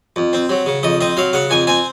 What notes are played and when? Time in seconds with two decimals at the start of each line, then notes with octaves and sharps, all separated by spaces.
0.16 F2
0.33 C4
0.49 F#3
0.66 C#3
0.83 F2 D#5
1.01 C4 D#5
1.17 F#3 F5
1.33 C#3 F#5
1.50 F2 G#5
1.67 C4 G#5